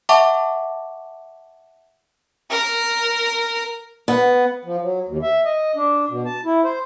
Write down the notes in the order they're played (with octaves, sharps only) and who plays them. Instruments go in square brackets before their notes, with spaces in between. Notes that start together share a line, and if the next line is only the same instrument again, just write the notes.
[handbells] E5 F#5 A5 C#6 D6
[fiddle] A#4
[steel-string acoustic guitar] B3
[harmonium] F3
F#3
D#2
E5
D#5
D4
B2
A5
E4
C5